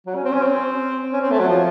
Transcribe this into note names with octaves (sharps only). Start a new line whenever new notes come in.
F#3
C#4
C4
C#4
C4
C#4
C4
A3
F#3
F3